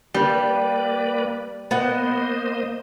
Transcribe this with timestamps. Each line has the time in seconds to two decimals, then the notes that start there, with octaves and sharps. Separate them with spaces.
0.14 G3 A#3 B4 D5
1.71 A#3 B3 C5 D#5 F#5